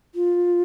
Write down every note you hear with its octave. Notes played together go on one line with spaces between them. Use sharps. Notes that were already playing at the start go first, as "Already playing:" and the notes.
F4